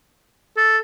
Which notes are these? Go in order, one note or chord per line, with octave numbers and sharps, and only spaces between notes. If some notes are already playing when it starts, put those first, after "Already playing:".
A4